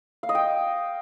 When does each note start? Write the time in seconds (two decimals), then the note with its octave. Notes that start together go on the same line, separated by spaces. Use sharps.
0.23 F5
0.29 D#5
0.35 G5